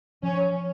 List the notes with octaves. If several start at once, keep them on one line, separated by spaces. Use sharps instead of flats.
F3 C#4